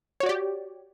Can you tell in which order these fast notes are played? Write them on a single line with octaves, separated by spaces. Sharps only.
C#5 F#4 D5 G4